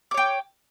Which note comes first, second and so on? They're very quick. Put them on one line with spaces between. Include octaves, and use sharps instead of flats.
D6 C#5 G5